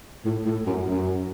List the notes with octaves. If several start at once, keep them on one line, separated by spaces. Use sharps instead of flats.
A2
A2
F#2
F#2